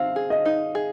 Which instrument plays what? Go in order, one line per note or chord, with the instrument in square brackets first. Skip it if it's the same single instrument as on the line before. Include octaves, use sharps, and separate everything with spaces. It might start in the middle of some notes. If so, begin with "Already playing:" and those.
Already playing: [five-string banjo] C4 [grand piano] F5
[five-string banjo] G#4
[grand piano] D#5
[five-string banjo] D#4
G#4